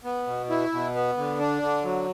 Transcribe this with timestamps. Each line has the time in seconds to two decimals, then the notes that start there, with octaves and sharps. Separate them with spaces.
0.04 B3
0.27 B2
0.50 E4
0.73 B2
0.95 B3
1.17 D3
1.39 D4
1.62 D3
1.84 F#3